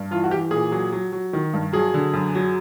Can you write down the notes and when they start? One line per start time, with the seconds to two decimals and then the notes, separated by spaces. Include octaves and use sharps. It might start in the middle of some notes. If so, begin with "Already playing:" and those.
Already playing: G2
0.11 E3 F4
0.24 F#4
0.31 E3 G4
0.51 A#2 G#4
0.72 F#3
0.92 F#3
1.12 F#3
1.33 D#3
1.53 G2
1.73 F#3 G#4
1.94 D3
2.13 F#2
2.35 F#3